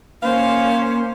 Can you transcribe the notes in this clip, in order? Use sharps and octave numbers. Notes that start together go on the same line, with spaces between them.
A#3 C#4 C5 F5